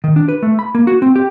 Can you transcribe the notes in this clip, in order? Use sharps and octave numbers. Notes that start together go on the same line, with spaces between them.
D#3
D4
B4
A3
B5
A#3
F#4
C4
G4